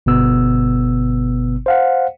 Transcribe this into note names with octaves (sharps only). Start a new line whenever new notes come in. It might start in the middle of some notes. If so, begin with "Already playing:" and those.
G1 B2 B3 E6
C5 F5 F#5